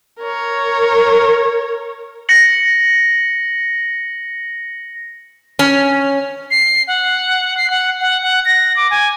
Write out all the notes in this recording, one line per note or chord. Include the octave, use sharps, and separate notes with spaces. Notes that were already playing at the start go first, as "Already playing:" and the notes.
A#4 C#5
A#6 C#7 F#7
C#4
C7
F#5
C7
F#5
F#5
F#5
A#6
D6
G#5